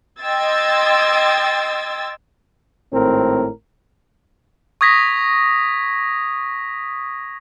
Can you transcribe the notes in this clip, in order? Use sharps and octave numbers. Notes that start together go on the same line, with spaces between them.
D#5 G5 C6 E6 G#6 A6
G#1 A2 C4 A#4
C#6 D#6 G#6 A#6 B6